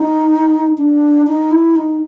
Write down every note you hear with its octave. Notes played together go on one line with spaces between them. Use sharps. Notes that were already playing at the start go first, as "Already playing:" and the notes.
Already playing: D#4
D4
D#4
E4
D#4